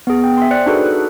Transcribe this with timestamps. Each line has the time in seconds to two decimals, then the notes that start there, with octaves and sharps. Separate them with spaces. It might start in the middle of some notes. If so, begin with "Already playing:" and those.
0.07 B3 G#4
0.24 G5
0.37 E5 G#5 C6
0.51 C5 D5 F#6 C#7
0.66 D4 D#4 F#4 G#4 A4 B4
0.86 F#6